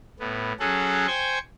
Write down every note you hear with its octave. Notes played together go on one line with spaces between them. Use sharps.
A2 B3
F#3 C#4 G#4 A4 F#5
C5 G5 G#5 C#6